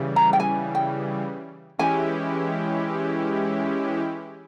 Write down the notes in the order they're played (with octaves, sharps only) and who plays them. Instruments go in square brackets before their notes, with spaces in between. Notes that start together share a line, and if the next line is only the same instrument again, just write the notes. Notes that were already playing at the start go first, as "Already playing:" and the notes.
Already playing: [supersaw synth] C#3 E3 G3
[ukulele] A#5
G5
G#5
G5
[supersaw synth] E3 G#3 C#4 E4 G4 [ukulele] G#5